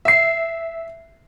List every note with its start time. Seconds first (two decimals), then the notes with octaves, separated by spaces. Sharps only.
0.05 E5 C7